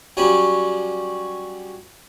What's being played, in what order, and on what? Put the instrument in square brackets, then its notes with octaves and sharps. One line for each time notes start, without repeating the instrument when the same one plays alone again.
[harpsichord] F#3 G3 C#4